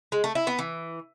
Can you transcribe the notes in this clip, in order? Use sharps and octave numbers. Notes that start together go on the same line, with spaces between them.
G#3
A3
E4
B3
E3